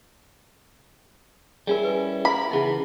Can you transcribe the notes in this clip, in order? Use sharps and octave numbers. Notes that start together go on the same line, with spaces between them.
G3 C#4 E4 G#4 A#4
B4 G#5
E4 A#4 B5
C#3 E3 B3 D#4 G#4 E5